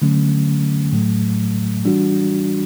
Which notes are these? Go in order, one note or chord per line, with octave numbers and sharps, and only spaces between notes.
D3 F#3 A3 C#4
A2 F#3 A3
E3 G3 D4 F#4